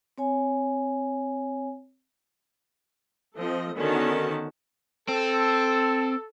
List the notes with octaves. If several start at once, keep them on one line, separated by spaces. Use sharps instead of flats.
C4 C#5 G#5
F3 C4 A4 D#5
D3 D#3 B3 C#4 F#4 A5
C4 A4